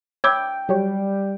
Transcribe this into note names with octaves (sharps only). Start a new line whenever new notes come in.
C#5 G5 B5 D6 E6 G6 G#6
F#3 G3 G4 C#5